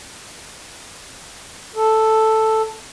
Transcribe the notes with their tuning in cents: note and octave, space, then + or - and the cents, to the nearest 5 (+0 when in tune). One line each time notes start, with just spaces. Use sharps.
A4 +0